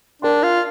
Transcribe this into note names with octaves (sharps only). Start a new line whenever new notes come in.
D4 A#4 G5 C6
F4